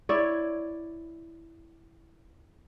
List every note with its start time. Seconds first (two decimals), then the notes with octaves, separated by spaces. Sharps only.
0.09 E4 C#5 D5